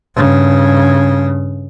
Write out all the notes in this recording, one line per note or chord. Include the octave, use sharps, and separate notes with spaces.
G2 C#3